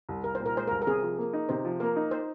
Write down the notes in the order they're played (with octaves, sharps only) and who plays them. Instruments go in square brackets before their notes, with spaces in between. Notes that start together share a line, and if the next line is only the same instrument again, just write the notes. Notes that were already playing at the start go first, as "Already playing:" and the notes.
[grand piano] C2
[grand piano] C2 [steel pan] A#4
[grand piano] A#2 [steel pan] C5
[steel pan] A#4
[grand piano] G#3 [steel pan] C5
[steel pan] A#4
[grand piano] C2
[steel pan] A#4
[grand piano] C3 [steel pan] G#4
[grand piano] F3
A#3
D#4
[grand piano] C3 [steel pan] C5
[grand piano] F3
[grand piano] A#3 [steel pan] A#4
[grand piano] D#4
[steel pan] C5